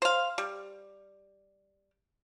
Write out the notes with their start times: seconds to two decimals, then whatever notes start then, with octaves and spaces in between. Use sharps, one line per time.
0.02 C5 F5
0.38 G3